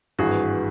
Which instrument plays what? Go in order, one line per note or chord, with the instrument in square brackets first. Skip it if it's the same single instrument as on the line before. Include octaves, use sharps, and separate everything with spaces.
[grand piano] G#1 G2 E3 F#4 G#4